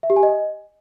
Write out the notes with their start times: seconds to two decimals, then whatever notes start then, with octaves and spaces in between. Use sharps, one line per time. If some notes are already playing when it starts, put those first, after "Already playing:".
0.03 E5
0.10 G4
0.16 G#5
0.23 D#5